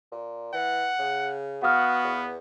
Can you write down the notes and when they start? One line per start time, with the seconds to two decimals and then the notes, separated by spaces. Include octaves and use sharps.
0.12 A#2
0.54 E3 F#5
0.99 C#3
1.63 B3 F#4 F5 D#6 F6
2.04 E2